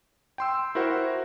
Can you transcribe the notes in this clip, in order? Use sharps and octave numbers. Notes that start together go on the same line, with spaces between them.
G5 C6 E6
E4 F#4 A#4 C5 F#5